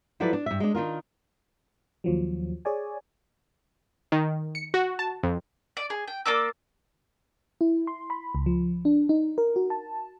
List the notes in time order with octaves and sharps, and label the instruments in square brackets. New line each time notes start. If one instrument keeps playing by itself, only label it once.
[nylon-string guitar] F3 F#3 E4 A4 B4 D5
D4
G2 E5
G#3 D4
D#3 D4 F4 A#4
[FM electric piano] D#2 F3 F#3
G#4 C#5 D5 G#5
[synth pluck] D#3
C#7
F#4
A5
F2
[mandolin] D5
G#4
G5
A#3 D5 D6 E6
[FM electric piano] E4
C6
B5
C#2
F3
D4
D#4
A#4
F#4
A5